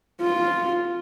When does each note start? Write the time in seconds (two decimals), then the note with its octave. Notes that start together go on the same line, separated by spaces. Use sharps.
0.21 F4